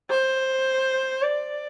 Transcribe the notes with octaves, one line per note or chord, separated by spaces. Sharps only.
C5
D5